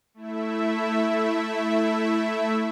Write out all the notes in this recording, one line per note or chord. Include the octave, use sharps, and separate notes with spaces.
A3 E4 E5